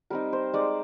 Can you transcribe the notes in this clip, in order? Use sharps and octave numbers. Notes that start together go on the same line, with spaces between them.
G3 C4 D#4 A#4
C5
G#3 D#4 D5